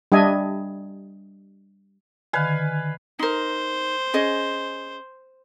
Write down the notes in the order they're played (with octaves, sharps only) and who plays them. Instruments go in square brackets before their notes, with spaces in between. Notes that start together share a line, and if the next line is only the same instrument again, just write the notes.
[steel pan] G3 D4 D#5 E5 G#5
[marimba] D3 D#3 [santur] B4 F5 G#5
[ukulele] D#4 A#4 [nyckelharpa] C5
[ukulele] C#4 G#4 D#5